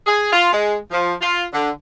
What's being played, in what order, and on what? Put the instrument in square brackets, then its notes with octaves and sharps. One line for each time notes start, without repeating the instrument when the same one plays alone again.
[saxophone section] G#4
F4
G#3
F3
F4
D3